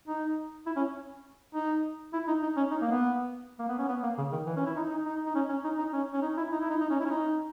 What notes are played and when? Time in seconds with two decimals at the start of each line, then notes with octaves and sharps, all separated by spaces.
0.08 D#4
0.66 E4
0.76 C#4
1.54 D#4
2.13 E4
2.27 D#4
2.42 D#4
2.57 C#4
2.71 D#4
2.82 A#3
2.91 B3
3.59 A#3
3.69 B3
3.78 C#4
3.88 B3
4.03 A#3
4.18 C#3
4.32 D#3
4.47 E3
4.56 C#4
4.66 E4
4.76 D#4
4.91 D#4
5.05 D#4
5.26 D#4
5.35 C#4
5.49 C#4
5.64 D#4
5.78 D#4
5.93 C#4
6.13 C#4
6.22 D#4
6.37 E4
6.52 D#4
6.61 E4
6.70 D#4
6.81 D#4
6.90 C#4
7.00 E4
7.05 C#4
7.10 D#4